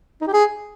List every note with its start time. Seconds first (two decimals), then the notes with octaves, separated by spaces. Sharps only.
0.21 D#4
0.27 G4
0.33 G#4